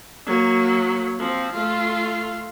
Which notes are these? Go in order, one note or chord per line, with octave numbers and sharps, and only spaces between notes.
F#3 A#3
F3 C4
A3 F4